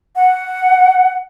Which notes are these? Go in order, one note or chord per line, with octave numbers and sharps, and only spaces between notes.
F#5